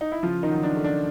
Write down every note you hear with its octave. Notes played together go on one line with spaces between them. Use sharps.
D#4
E4
C#3 F3 F4
D#3 D#4
F#3
D4
A3
D4